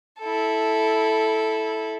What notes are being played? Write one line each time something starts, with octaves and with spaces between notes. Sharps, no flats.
E4 A4